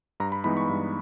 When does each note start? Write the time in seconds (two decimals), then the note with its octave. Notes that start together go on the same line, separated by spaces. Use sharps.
0.20 G2 A#5
0.32 B5
0.44 E3 G#3 B3 D#4 B5
0.57 C#6
0.69 G2